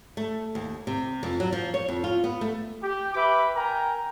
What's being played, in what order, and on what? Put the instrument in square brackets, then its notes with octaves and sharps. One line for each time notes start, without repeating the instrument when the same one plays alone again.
[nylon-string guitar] A3
D#2
C3
F2
F#3
F3
C#5
F2
F4
B3
A3
[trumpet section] G4
B4 E5 G5 B5 D6
A#4 G5 G#5 A#5